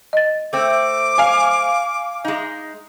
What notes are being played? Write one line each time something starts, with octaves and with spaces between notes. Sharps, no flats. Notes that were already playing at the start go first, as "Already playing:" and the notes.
D#5 A6
A3 C4 D6
F5 G#5
G#3 D#4